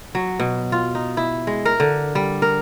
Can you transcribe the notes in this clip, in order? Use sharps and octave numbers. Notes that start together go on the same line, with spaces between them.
F#3
B2
F4
D#4
E4
G#3
A#4
D3
G3
A#4